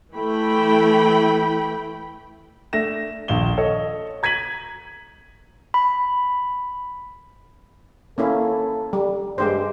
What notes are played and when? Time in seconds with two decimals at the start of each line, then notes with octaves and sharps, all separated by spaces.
0.15 E3 A3 E4 G5 B5
2.73 A3 D4 E5 A#6 E7
3.28 D#1 A#1 F5 E7 G7
3.58 A4 C#5 D#5
4.23 A#5 G#6 B6 D#7 F#7
5.74 B5
8.18 A#3 C#4 E4 A4
8.93 G3
9.38 G2 G#3 G4 C5